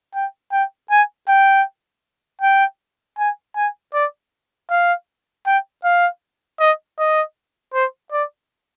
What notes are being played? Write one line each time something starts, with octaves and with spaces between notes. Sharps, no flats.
G5
G5
G#5
G5
G5
G#5
G#5
D5
F5
G5
F5
D#5
D#5
C5
D5